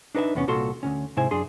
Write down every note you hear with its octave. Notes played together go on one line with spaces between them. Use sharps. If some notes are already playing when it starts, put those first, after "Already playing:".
D4 D#4 B4 C#5 E5
E2 C3 B3 C#4
C2 A#2 F#4 A4 C6
D2 A#2 C#4
G#2 C3 E4 C5 G#5
F#2 D4 G#4 C6